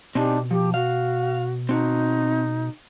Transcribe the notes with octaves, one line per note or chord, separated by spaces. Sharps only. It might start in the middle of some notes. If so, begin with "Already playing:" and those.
B2 C4 D4 D#4 G4
F3 G4
F#4 F5
C4 D#4 F#4